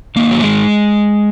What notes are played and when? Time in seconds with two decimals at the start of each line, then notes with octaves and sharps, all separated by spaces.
0.16 G#2 D#3 A#3
0.31 F#3
0.40 G#3